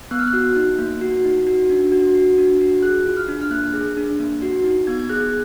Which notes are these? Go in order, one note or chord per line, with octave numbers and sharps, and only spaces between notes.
B3 F#6
F6
F#6
F#4
D#4
A#3
F#4
D#4
F#4
D4
F#4
F#4
D4
F#4
G#4 F#6
F4
F6
D4
F6
A#3 F#6
G#4
D4
A#3
F#4
D#4
B3 G#6
G#6
G#4 F#6